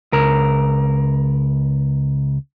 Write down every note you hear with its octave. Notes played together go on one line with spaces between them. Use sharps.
C#2 A#4